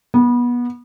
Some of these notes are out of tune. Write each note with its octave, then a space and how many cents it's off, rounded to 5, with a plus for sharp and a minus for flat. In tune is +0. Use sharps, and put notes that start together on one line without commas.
B3 -25